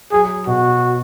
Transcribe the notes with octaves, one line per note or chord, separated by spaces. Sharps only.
F#3 G#4
B2 F#4